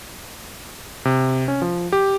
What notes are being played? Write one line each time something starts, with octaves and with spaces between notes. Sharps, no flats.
C3
C#4
F3
G4